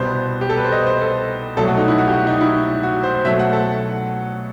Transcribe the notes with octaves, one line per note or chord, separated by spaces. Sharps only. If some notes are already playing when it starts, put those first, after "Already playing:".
Already playing: C2 B2 G3 B3 C5
G4
A4
B4
C5
D#5
C5
A4
C2 B2 F#3 A3 A4
F#4
D#4
E4
F#4
G4
F#4
D#4
E4
F#4
C5
C5
B2 F#3 A3 E5
F#5
A4